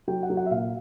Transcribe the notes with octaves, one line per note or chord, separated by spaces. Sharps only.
F#3 G5
F#5
F#3
F#5
E5
A#2 F5